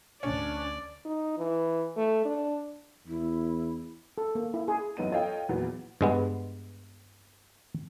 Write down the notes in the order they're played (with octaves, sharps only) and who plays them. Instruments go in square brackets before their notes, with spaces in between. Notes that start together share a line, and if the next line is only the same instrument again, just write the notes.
[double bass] D2 [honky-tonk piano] C#4 [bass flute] D4 [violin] D5
[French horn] D#4
E3
A3
D4
[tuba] E2 [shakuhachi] E4
[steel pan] A4
A#3
E4
G#4
[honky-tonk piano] A1 F#2 B3 D#4 D#7
F4 A4 C#5 D#5 F5 G5
E2 A#2 F#3 B3
[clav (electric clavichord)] G2 G#3 B3